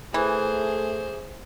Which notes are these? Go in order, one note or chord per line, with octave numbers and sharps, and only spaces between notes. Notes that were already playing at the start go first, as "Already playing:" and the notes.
E3 A3 G#4 C5